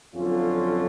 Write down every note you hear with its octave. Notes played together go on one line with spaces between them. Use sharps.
F2 D3 F#3 C#4 F4